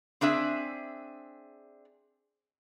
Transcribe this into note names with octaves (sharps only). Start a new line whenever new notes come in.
C4 D4 G#4 E5